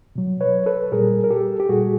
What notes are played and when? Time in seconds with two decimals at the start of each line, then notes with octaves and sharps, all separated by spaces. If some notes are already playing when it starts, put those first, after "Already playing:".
0.16 B2 F#3
0.41 B4 C#5
0.66 A4 B4
0.92 A#2 G3 G#4 A#4
1.24 A#4
1.30 G4 A4
1.60 G4
1.69 A#2 G3 F#4 G#4